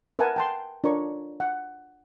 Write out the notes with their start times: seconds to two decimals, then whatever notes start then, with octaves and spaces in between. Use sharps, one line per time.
0.19 A#4 B4 E5 F#5 G#5 A5
0.36 G5 A5 C6
0.84 D4 F4 A#4 C#5 A#5 C#6
1.40 F#5